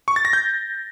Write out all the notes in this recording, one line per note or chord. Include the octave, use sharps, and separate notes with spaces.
C#6
A6
A#6
G6